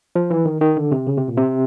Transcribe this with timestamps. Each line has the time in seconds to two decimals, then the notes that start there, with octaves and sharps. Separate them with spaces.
0.16 F3
0.30 E3
0.46 D#3
0.61 D#3
0.77 D3
0.91 C3
1.07 C#3
1.17 C3
1.28 A#2
1.37 C3